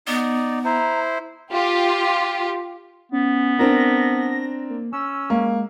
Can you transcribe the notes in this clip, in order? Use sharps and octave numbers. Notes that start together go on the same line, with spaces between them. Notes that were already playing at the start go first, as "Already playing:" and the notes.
B3 D#4 D5
E4 C5 A#5
F4 G4
B3 C#4
C4 D4 A#4 A#6
A#3
C#4 E6
G#3 A#3